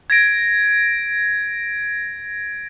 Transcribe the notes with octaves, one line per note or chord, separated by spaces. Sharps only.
G#6 A#6 D7